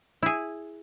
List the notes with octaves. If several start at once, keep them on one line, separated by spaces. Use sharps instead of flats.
E4 G#4